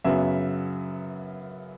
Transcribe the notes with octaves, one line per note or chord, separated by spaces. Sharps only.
F#2 C#3 F#3 B3 E5